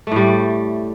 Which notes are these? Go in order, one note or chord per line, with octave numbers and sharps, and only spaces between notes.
A2 G3 A3